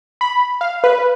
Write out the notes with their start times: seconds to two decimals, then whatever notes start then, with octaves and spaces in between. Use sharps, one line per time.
0.21 B5
0.61 F5
0.84 B4